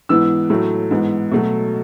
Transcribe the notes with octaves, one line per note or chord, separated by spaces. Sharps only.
G#2 E3 B3 E6
A2 F#3 A3
G#2 E3 B3
B2 F#3 A3